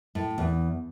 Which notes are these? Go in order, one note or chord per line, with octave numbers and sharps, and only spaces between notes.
A2
E2